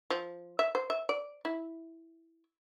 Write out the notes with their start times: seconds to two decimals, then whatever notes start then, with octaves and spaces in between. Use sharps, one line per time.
0.10 F3
0.59 E5
0.75 C5
0.90 E5
1.09 D5
1.45 E4